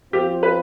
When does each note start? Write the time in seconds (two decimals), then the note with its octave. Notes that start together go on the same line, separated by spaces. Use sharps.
0.13 F3 C4 F4 G4
0.43 B4